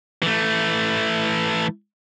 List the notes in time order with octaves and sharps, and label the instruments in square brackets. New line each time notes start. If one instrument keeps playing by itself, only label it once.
[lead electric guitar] E3 A3